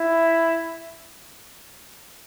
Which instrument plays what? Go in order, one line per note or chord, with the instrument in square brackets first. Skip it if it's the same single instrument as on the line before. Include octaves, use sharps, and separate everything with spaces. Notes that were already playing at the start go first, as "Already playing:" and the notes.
Already playing: [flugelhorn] E4